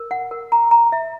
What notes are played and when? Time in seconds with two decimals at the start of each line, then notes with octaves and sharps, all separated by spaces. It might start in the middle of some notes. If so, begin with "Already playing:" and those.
Already playing: A#4
0.11 F#5
0.31 A#4
0.52 A#5
0.71 A#5
0.92 E5